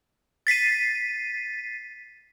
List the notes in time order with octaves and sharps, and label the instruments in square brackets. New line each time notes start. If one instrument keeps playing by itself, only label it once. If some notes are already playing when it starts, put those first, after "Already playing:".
[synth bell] A6 B6 C7 D#7